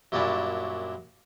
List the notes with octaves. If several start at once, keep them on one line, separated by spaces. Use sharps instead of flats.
F#2 A#2 G3 C#4 D4 E4